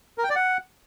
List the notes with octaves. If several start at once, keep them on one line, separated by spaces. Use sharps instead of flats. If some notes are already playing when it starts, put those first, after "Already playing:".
A#4
G5
D5
F#5